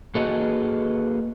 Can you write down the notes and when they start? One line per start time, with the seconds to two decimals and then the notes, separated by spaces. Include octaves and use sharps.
0.15 A#3 F#4 G#4 A4 B4 D#5